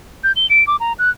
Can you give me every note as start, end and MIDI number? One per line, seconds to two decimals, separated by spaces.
0.24 0.32 91
0.36 0.46 103
0.50 0.64 98
0.67 0.76 86
0.80 0.93 82
0.99 1.10 90